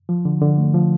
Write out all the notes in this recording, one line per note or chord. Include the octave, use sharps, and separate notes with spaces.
F3
D3
D3
A3
F3